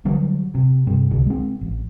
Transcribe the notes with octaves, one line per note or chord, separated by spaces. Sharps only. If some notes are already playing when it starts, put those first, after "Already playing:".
D3 F#3 G3
C3
G2 C3
D1 C2 D3
G#3 C4
A1